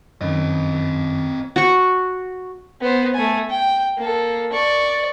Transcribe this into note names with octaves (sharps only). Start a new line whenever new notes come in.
F#2 D#3 C4 D#5
F#4 C#6
B3 C5
A3 G#5
G5
A#3 A4
D5 C#6